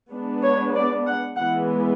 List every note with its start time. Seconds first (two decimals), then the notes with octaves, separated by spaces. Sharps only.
0.11 G#3 B3 D4
0.43 C#5
0.75 D5
1.07 F#5
1.37 E3 G#3 B3 F#5